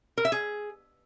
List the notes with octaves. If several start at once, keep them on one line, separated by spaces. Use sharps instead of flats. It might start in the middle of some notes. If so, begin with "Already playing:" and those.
A#4
E5
G#4